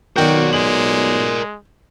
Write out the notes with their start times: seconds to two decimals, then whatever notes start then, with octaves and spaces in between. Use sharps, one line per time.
0.16 B1 D#3 F#4 A#4 D5 G5 G6
0.53 G#3 F#7